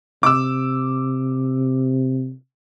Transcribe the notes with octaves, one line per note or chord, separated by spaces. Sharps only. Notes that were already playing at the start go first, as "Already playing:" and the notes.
C3 D6 E6